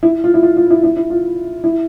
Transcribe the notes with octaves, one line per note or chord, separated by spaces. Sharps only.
E4
F4
E4
F4
F4
E4
E4
E4
F4
E4